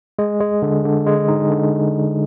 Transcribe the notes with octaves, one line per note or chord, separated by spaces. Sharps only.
G#3
G#3
D3
D3
G#3
D#4
D3